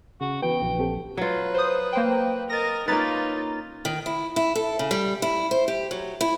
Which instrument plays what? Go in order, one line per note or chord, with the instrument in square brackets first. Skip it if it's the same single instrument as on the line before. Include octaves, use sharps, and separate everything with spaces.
[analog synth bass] C#3 [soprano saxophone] F#4
[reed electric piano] E3 F#4 B4 [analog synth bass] B3 [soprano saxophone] G5
[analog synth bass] A#1
[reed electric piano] C4 G4 A4
[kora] F#3 F4 [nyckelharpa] B4
[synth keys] C5 D#6
A#3 C5 G5
[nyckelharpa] A#4 D#5 [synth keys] A6 A#6
[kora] A#3 C#4 B4 [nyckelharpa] D#4 F4 [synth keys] A#5 A6
[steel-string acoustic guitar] D#3
E4
E4
A4
C#3
G3
E4
C5
G4
F#3
E4